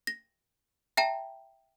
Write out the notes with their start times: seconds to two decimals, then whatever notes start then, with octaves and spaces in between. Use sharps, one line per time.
0.07 A#6
0.97 E5 G5 A5 A#5